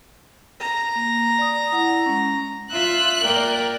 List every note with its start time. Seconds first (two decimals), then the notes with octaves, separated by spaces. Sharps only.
0.60 A#5
0.96 A#3
1.38 D5 D#6
1.72 E4 F#5
2.06 G#3 C#4
2.72 F4 E5 F#6
3.22 A#3 A#4 D5 G5